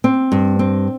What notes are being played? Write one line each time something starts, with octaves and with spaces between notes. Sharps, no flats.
C4
G2
C4